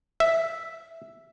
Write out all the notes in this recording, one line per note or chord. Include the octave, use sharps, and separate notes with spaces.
E5